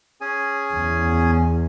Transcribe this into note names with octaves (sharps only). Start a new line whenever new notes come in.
C#4 G#4 G#5
E2